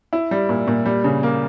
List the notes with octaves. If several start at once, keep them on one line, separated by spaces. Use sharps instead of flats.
E4
G3
A#2
A#2
G3
C#3
A#3